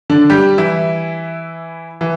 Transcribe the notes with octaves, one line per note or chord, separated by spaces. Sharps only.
D3 D4
G3 G4
E3 E4
E3